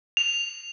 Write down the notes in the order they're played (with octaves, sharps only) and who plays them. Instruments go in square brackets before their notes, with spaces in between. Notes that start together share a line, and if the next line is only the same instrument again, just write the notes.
[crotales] F7